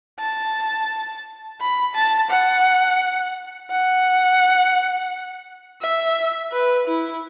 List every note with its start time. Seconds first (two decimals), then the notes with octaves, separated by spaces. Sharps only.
0.20 A5
1.61 B5
1.95 A5
2.31 F#5
3.71 F#5
5.82 E5
6.52 B4
6.87 E4